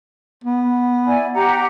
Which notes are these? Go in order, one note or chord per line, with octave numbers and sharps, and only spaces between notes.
B3
E4 D5 G#5
G4 F#5 A#5